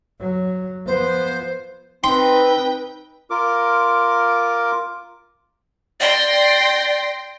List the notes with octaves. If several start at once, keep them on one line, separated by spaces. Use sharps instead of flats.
F#3
F3 B3 C5
C4 D#4 B4 G5 C6
F4 A#4 D6
D5 G5 C6 A#6